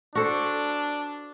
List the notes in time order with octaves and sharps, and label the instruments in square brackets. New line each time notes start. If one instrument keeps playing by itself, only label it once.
[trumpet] D4 [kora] F#4 A4 C5